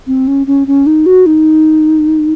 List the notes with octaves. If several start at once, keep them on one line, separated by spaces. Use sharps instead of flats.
C4
C#4
C#4
C#4
D#4
F#4
D#4